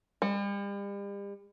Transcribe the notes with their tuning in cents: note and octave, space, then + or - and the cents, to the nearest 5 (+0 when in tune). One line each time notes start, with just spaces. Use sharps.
G3 +40